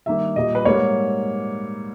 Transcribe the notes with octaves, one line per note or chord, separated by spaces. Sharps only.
G2 D#3 A#3 E5
A#2 G3 A#3 D#5
B4
G#2 G3 A#3 C#5